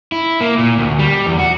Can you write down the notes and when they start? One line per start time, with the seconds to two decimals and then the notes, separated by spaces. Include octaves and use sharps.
0.12 E4
0.41 A#3
0.58 A#2
0.78 D2
0.99 G3
1.26 E2
1.39 F#4